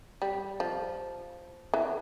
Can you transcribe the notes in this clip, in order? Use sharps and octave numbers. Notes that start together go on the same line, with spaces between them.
G3
F3
E3